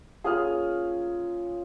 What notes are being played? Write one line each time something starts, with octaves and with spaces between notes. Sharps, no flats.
A#3 C#4 F4 G#4 D#6 F6